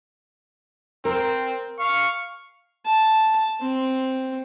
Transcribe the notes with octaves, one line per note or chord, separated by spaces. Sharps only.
C4 A#4
F5 C#6
A5
C4